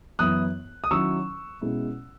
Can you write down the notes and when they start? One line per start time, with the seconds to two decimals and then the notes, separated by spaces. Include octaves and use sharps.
0.19 F#2 E3 B3 E4 D#6 F#6
0.84 D#6
0.91 D#3 F#3 C#4 E4 C#6 E6
1.61 B2 G#3 C#4 E4